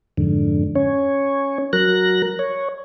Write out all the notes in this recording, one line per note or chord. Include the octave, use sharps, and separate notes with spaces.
F2 G#2 D3
C#4 C#5
F#3 A#4 F#6 A#6
C#5